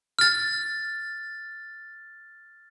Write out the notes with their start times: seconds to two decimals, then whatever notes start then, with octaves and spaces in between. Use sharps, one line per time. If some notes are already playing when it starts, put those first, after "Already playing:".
0.19 F6 A6